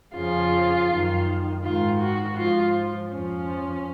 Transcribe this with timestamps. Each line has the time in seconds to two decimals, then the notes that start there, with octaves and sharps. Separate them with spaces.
0.14 F2 C#3 F3 F4
0.88 F#2 D#3
1.63 G#2 D#3 F4
2.00 F#4
2.36 G#2 F3 F4
3.11 F2 F3 C#4